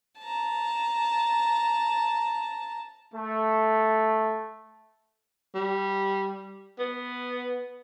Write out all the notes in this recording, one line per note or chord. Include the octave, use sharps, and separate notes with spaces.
A5 A#5
A3
G3
B3